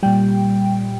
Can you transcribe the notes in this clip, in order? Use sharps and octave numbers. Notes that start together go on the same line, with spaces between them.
A#2 G3 G5